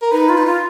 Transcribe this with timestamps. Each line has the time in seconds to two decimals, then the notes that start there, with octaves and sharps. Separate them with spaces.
0.02 A#4
0.12 D#4 B4
0.29 F4
0.38 D#4
0.46 F4